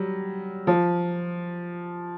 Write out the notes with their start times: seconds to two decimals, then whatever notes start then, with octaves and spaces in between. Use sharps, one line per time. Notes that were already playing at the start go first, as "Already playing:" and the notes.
Already playing: F#3 G3
0.67 F3